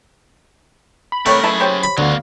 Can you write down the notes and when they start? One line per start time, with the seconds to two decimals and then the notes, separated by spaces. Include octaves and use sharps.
1.12 B5
1.26 C3 G3 A3 B3 A#4 C#5
1.43 F#2 E4 G#4 B4 A5
1.60 G4 C5 C#5
1.83 B5
1.98 D2 D3 F#3 B3 F5